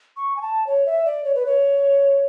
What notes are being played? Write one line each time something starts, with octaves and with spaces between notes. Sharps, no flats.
C#6
G#5
A5
C#5
E5
D5
C#5
B4
C#5